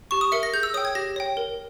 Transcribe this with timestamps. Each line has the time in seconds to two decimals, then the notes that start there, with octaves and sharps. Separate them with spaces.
0.11 G4 C#6
0.21 D#6
0.32 A#4 E5 C#7
0.43 A#6
0.53 G#4 G6
0.63 E6
0.74 C#5 D#6
0.77 G5
0.85 G#6
0.95 G4 A#6
1.16 C#5 G5
1.37 A#4